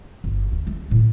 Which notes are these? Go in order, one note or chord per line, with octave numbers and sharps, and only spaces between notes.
G1
D2
A3
A2